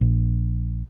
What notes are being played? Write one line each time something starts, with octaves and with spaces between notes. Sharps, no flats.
A#1